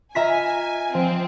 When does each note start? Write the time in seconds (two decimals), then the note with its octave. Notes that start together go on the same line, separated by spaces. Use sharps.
0.15 F4 D#5 E5 G#5 A#5 F6 B6
0.95 F3 C4